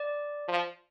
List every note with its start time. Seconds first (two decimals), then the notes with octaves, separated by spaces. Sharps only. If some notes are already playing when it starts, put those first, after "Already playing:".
Already playing: D5
0.48 F3